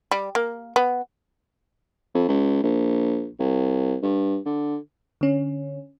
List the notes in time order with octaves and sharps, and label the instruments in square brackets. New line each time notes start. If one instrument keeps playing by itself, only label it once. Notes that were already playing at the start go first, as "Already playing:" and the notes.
[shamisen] G3
A#3
B3
[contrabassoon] F2
C#2
A#1
C2
G2
D3
[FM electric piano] D3 C#4